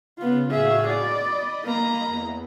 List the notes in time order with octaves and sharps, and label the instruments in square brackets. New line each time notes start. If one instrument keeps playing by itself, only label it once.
[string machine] C#3 [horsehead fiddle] B3 F4
[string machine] A2 F#4 F5 [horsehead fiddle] G#4 E5
[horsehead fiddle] D5 [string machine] D#5 B5
[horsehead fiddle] A#3 A#5
[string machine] E2